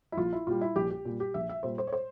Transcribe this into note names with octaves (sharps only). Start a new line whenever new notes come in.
E4
A#1 F4
E4
A#2 G3 F4
E4
A#1 G4
G4
A#2 G3
G4
A#1 E5
E5
A#2 G3 C5
C5
C#5
C5